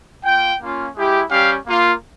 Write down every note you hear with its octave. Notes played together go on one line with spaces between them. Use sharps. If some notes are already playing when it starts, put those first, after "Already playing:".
A#3 F4 G5
A#3 C#4 F4
G#3 E4 G4
G3 C#4 G4 F5
A#3 F4